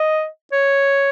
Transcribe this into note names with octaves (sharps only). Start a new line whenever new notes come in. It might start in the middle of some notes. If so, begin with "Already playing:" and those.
Already playing: D#5
C#5